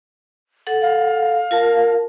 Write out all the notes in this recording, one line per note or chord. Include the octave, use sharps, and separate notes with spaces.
A4 F#5
F5
F4 A#4 A5